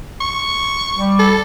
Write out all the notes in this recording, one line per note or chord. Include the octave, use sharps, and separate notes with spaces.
C#6
G3
A4